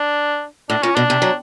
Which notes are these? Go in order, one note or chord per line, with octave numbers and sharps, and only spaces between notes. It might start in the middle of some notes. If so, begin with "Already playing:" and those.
Already playing: D4
A2 D4
A#2 C#4
B2 D4
C3
F#3